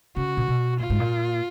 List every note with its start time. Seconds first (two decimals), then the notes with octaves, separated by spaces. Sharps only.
0.16 C#3 F#4
0.37 A#2
0.48 B2
0.80 A#2 F4
0.90 G#2
1.00 A#2